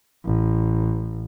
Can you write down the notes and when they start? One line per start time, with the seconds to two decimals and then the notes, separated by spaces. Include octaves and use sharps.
0.25 A1